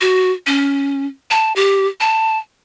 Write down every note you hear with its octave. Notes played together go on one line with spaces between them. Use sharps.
F#4
C#4
A5
G4
A5